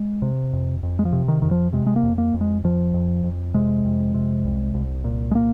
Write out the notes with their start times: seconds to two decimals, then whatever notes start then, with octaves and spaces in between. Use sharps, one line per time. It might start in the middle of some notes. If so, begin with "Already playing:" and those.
Already playing: G#3
0.22 C3
0.53 F2
0.83 F2
0.99 G#3
1.05 F3
1.13 C3
1.28 D#3
1.42 F2 D#3
1.51 F3
1.73 C3 G#3
1.87 G#3
1.96 A#3
2.03 F2
2.18 A#3
2.34 F2
2.41 G#3
2.64 F2 F3
2.94 F2
3.24 F2
3.54 C3 G#3
3.85 F2
4.14 C3
4.44 C2
4.74 C2
5.04 A#2
5.31 G#3
5.35 A#2 A#3